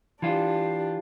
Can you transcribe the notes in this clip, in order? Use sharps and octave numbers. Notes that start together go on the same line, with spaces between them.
E3 D4 F4 G4